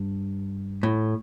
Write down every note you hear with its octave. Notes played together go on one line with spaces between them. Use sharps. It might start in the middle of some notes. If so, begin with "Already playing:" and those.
Already playing: G2
A2